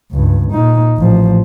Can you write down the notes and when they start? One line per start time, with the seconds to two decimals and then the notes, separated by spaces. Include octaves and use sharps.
0.12 C#2 G2
0.51 A#2 D#4
0.97 A1 F3